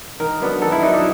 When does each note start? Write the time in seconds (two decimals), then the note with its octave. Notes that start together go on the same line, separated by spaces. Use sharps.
0.20 D#3 A#4
0.40 F#3 B3 D4
0.62 D#3 A4
0.72 E4
0.83 F#3 B3 D4 D#4
0.94 D4